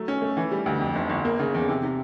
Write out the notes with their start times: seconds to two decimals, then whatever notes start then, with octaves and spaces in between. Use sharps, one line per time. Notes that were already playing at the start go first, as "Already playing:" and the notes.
Already playing: F#3 A3
0.08 C#4
0.22 A3
0.37 E3
0.51 G3
0.66 D2
0.80 F2
0.95 G1
1.10 G1
1.25 A#3
1.40 C#3
1.54 E2
1.69 C3
1.83 C3